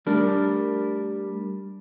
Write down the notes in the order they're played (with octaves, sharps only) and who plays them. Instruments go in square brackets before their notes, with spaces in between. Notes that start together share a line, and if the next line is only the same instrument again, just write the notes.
[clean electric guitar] G3 A3 D4 A#4 D5